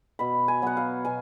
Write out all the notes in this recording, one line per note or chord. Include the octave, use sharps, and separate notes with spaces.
B2 B5
G#5
F#3 B3 F#5
F5
B2 G#5